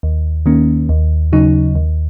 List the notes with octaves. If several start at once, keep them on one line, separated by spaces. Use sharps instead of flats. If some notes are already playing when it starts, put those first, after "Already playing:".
D#2
D#3 A#3 C#4
D#2
C#3 F#3 D#4
D#2